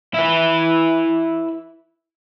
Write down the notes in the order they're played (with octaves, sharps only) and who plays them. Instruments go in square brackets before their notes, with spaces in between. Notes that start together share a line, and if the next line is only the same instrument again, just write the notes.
[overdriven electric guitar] E4 B4